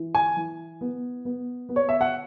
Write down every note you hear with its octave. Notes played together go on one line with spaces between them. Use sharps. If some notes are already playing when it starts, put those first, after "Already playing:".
Already playing: E3
G#5
E3
B3
B3
B3
C#5
E5
F#5